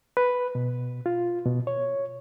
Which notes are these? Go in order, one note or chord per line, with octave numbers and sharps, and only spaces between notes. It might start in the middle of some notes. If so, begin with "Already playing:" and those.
B4
B2
F4
B2
C#5